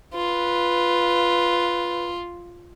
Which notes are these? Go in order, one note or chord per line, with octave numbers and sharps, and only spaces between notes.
F4 B4